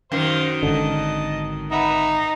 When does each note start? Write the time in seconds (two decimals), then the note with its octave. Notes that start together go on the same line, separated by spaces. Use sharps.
0.12 F#2 D#3 C5 F5
0.63 G#1 D3 D#5 A5
1.71 D#4 B4 E5 F#5